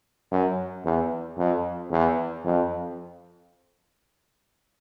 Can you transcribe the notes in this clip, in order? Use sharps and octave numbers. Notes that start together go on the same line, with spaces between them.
F#2
E2
F2
E2
F2